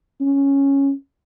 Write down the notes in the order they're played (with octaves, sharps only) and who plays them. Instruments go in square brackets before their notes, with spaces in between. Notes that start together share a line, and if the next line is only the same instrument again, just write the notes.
[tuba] C#4